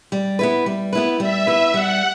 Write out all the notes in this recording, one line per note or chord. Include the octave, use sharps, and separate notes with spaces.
G3
B3 E4 B4
G3
B3 E4 B4
G3 E5
B3 E4 B4
G3 F#5